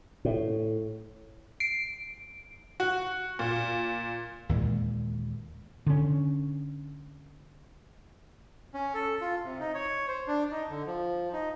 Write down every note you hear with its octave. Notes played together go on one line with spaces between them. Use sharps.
A2
C7 D7
F#4
A#2
D#2 A#2 E3 G#3
D3 C#4
C#4
A4
F4
C3
D#4
C#5
C5
D4
D#4
D3
F3
D#4